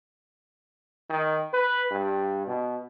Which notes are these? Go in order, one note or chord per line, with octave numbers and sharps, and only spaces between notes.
D#3
B4
G2
B2